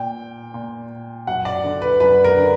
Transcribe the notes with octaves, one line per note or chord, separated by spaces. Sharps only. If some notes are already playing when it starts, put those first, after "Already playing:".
Already playing: A#2 G5
A#2
F#2 F#5
D5
D3
B4
F#2 B4
A#4
D3